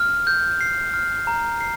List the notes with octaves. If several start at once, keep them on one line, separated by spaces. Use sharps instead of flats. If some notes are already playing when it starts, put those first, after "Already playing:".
Already playing: F6
G6
C7
F6
A#5
C7